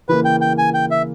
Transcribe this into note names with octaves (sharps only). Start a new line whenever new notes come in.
C#3 E3 A#3 B4
G5
G5
G#5
G5
E5